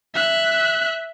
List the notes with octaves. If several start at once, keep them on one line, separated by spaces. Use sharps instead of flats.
E5 F#6